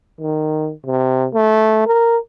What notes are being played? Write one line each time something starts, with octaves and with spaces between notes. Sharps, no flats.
D#3
C3
A3
A#4